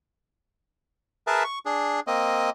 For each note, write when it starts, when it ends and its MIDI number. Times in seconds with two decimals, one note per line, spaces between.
1.27 1.43 68
1.27 1.43 70
1.27 1.43 71
1.27 1.43 76
1.27 1.43 81
1.44 1.59 85
1.66 2.00 62
1.66 2.00 68
2.07 2.50 58
2.07 2.50 60
2.07 2.50 75